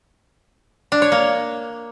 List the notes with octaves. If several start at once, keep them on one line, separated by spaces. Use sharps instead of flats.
D4
C#5
A#3